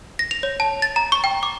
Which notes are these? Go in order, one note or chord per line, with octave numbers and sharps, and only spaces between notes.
A#6
F7
C#5
A5
A6
A#5
C#6
G5
D6